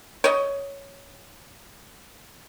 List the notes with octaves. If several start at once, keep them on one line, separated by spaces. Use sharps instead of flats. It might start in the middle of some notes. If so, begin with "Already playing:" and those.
C#5 D#5